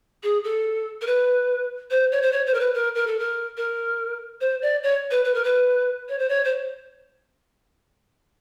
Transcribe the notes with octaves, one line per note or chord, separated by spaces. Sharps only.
G#4
A4
A#4
B4
C5
C#5
C5
C#5
C5
A#4
B4
A#4
A#4
A4
A#4
A#4
C5
D5
C#5
B4
B4
A#4
B4
C#5
C5
C#5
C5